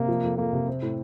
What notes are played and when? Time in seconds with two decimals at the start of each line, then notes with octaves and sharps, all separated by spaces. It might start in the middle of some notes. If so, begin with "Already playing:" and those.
Already playing: C3 A#3
0.08 F3
0.23 F2
0.37 F2 A#3
0.53 C3
0.68 C4
0.82 A2